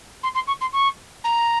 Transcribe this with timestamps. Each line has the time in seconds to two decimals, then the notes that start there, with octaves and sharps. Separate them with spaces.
0.23 C6
0.35 C6
0.47 C#6
0.61 C6
0.73 C#6
1.24 A#5